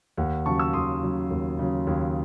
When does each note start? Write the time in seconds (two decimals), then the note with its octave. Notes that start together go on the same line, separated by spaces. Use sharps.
0.17 D#2 F#5
0.46 C#3 F#3 A5 C#6
0.60 C#6 E6
0.73 D#2 C6 D#6
1.03 C#3 F#3
1.30 D#2
1.59 C#3 F#3
1.87 D#2